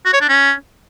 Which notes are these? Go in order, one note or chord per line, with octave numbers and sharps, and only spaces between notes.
F#4
C#5
D4
C#4